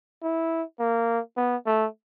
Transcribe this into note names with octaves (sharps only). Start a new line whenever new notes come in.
E4
A#3
B3
A3